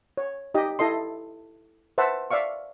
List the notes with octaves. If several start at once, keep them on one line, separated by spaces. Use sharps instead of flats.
C#5
D#4 G4 D#5
E4 A4 D#5 C6
B4 C5 E5 F#5 A5
D5 E5 F5 C#6